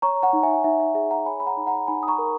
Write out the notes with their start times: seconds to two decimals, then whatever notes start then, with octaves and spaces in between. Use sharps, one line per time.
0.02 C#5 A#5 C#6
0.23 F#5 A#5
0.33 D#4
0.43 E5 G#5
0.64 D#4 E5
0.80 E5
0.95 G#4 E5
1.11 F#5 A#5
1.26 C#5 G#5 B5
1.40 B5
1.47 F#5 A#5
1.57 D#4
1.67 F#5 A#5
1.88 D#4 G#5 B5
2.03 D#6
2.08 A#5 C#6
2.18 A#4